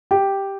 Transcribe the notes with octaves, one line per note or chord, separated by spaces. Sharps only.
G4